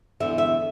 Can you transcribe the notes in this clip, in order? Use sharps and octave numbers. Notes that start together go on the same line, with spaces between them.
E2 D3 E5
E5